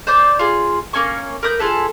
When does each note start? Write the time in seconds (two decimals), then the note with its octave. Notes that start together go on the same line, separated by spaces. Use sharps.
0.07 C5 D5 D6 G6
0.39 F4 G#4
0.93 A#3 C#4 G#5 C#6
1.43 A#4 B4 D#6 G6
1.59 F4 G#4 A4 B4